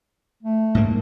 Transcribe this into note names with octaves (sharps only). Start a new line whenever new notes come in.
A3
G#2 A#3